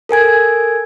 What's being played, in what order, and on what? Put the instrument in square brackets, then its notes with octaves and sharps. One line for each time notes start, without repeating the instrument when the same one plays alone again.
[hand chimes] A4 A#4 G#5 G#6